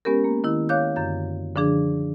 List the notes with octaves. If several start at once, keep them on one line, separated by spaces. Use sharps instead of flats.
G#3 B3 C#4 G4 A#4
A#3
D#3 E4
C#5 F5 D6 F#6 G6
F#2 D3 G6
D3 F3 D4 G#4